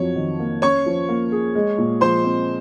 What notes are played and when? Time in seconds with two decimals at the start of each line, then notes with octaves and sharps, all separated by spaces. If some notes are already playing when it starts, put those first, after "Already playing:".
Already playing: F2 F3 F#3 C#5
0.16 D#3
0.39 A#3
0.62 C#4 C#5 C#6
0.86 F3
1.09 A#3
1.32 G#4
1.55 G#3
1.78 A#2
2.01 F3 C5 C6
2.24 C4